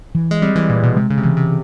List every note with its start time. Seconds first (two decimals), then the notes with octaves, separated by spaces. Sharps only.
0.15 E3
0.31 G#3
0.42 G3 C4
0.56 E3
0.69 A#2 E3
0.83 B2
0.97 C3 G#3
1.10 C#3
1.18 C3
1.24 C#3 E3
1.37 C3